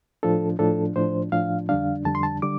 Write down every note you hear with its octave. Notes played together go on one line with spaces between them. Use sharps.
A2 F3 D4 A4
A2 F3 D4 A4
A2 F3 D4 C5
A2 F3 D4 F5
F2 D3 G3 D4 F5
F2 D3 G3 D4 A5
C6
A5
D3 G3 D4 D6